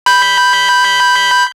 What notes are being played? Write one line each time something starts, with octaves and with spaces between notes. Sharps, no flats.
B5 G6